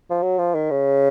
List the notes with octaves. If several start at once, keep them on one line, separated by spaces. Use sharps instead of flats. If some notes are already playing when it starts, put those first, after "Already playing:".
F3
F#3
F3
D#3
C#3